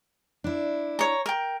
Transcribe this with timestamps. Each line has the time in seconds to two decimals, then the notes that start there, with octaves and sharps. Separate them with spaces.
0.44 D4 E4
0.99 C#5 A#5
1.26 A#4 G5